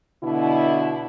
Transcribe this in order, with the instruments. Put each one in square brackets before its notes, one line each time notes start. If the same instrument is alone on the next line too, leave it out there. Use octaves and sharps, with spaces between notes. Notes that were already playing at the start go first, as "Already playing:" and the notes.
[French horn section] B2 D3 E4